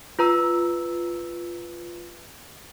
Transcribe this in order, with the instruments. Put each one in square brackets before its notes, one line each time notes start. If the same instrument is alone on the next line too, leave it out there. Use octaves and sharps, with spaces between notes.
[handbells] F4 B4 A#5 E6